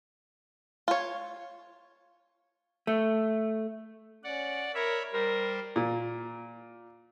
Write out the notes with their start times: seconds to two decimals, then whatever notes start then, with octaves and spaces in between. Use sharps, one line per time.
0.88 F4 C#5
2.87 A3
4.24 C#4 D5 F#5
4.75 A#4 C#5 E5 B5
5.13 G3 A#4 C5
5.76 A#2